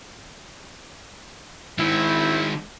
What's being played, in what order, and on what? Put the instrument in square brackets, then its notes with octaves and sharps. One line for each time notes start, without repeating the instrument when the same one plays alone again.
[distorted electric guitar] D#3 G#3 [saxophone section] C4 E4